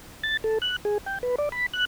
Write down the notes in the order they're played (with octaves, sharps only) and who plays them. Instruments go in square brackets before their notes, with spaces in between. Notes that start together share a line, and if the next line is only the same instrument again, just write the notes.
[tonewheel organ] A6
A4
F#6
G#4
G5
B4
D5
B5
F#6